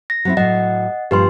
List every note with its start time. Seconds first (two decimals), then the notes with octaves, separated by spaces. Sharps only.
0.10 A#6
0.25 F#3 C4 E4
0.37 A2 F#3 D#5 F#5
1.11 G2 A#2 F3 G4 B4 C6